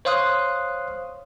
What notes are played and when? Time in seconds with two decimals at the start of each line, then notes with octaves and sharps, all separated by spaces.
0.05 C5 C#5 F5 C6 D#6 F#6